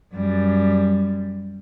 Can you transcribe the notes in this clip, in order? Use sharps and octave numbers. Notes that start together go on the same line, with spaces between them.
F#2 G3